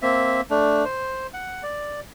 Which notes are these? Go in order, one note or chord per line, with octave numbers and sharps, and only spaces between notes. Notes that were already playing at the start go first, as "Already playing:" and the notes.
A#3 C4 E5
A3 D4
C5
F#5
D5